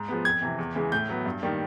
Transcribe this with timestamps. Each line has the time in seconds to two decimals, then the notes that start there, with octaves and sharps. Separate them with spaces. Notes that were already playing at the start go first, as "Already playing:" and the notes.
Already playing: G#2
0.08 F3 G#3 B3
0.25 F2 G#6
0.42 C3 E3
0.59 E2
0.75 C#3 E3 G#3
0.92 A2 G6
1.09 F#3 B3
1.26 G2
1.43 D#3 G3 A#3